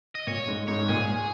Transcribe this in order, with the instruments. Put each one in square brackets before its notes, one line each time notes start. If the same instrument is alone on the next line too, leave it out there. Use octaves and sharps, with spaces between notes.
[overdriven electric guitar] D#5
[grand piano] A#2 [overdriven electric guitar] C#5
[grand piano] G#2
[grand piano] G#2 [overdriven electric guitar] C#5
[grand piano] G#2
[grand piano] A#2 [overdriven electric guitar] G#4